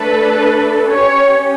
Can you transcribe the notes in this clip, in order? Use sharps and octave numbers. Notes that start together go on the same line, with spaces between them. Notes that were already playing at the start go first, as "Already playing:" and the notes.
Already playing: A3 D4 A4 B4
C#4 G4 C#5